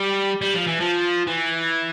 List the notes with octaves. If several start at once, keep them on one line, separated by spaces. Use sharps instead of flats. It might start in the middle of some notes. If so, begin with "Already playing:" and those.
Already playing: G3
G3
F3
E3
F3
E3